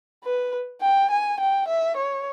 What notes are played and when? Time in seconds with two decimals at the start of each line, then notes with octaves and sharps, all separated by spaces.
0.24 B4
0.82 G5
1.10 G#5
1.40 G5
1.68 E5
1.97 C#5